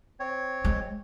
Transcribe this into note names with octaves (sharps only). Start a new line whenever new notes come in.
C4 C#5
G#3